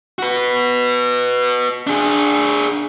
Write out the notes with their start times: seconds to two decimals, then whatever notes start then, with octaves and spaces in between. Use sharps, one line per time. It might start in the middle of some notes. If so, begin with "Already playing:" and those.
0.19 F#4 B4
1.87 D4 G#4